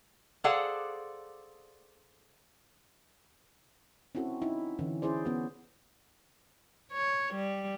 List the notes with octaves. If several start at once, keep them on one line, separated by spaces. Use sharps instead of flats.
G#4 A4 C5 D5 F5 F#5
C4 C#4 E4 F#4 A4
C#4 D#4 E4
D3 E3 C#4
C#4 E4 G#4 C5 D5
B3 C#4 F#4
C#5
G3